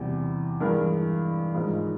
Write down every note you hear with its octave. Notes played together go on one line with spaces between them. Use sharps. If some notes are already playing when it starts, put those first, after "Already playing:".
Already playing: E2 C3 E3 G3
G2 E3 G#3 A#4
G#2 F3 G#3